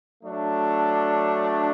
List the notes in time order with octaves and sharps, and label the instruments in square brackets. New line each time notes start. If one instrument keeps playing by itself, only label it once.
[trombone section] F#3 A3 D4